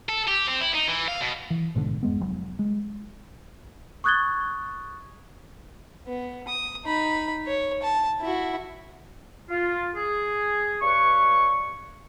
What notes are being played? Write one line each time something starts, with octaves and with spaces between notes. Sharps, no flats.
A4
G4
C4
E4
D#4
E3
F5
B2
E3
A1 G#2 B2 D3
F2 G#3 B3
F1 F#3
G#3
C#6 D#6 F#6 G#6 A6 G7
B3
D#6
D#4 B5
C#5
A5
E4 F#4
F4
G#4
G2 B4 C#5 D5 C#6